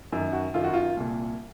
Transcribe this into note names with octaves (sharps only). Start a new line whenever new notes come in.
F#2 D#3
F#4
F#2 D#3 F4
F#4
F4
C2 A#2